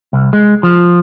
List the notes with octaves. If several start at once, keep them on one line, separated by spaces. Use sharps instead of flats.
C2
G#3
F3